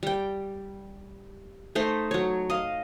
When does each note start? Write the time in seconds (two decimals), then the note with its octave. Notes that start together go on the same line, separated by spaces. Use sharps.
0.03 G3 G5
1.75 A3 D#4 C5
2.11 F#3 C#5
2.50 D#5 F5